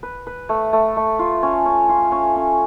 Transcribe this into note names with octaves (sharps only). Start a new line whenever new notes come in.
B4
B4
A3
A3
A3
F4
C#4
C#4
F4
C#4
C#4